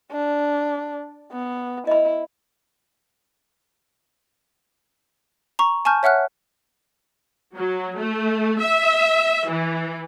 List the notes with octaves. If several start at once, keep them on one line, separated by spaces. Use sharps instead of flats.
D4
B3
E4 D#5 B5
A#5 C#6
G#5 A5 C#6 F6 G6
C#5 E5 F#5 F6 F#6
F#3
A3
E5
E3